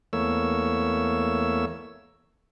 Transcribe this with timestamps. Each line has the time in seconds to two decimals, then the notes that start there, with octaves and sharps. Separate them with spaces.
0.13 E2 A3 A#3 C#5 E6